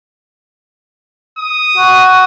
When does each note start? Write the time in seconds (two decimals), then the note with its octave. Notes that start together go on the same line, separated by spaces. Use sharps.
1.37 D#6
1.77 F#4